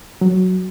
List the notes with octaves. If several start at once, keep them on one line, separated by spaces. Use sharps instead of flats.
F#3